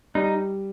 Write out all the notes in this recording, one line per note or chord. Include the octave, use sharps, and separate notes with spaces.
G3 D#4